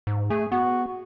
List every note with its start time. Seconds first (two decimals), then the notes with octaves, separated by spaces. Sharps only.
0.07 G#2
0.30 A3 G#4
0.52 B3 F#4